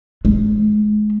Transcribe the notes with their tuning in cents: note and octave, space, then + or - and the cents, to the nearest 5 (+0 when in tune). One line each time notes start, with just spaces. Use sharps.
G#3 +30